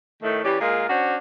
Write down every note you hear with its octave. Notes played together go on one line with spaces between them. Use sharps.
A2 D#3 A3
E3 C#4 G4 D5
A#2 G#3 F4 A#4
C#4 D4 F#4 C5